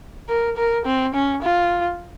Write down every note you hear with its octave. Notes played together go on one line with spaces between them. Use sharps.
A#4
A#4
C4
C#4
F4